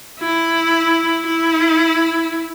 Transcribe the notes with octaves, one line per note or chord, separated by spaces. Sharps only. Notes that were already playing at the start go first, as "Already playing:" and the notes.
E4
E4